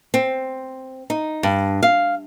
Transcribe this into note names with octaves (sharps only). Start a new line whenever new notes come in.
C4
D#4
G2
F5